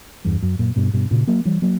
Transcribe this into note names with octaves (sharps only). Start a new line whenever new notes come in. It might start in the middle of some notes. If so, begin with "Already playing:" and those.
E2 G2
F#2
F#2 A#2
G2 B2
G2 B2
A#2 C#3
F#3 A#3
E3 G3
F#3 A#3